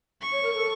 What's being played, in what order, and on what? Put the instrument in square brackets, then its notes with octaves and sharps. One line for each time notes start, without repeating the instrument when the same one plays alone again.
[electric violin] C#6
[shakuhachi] C#5
A#4
A4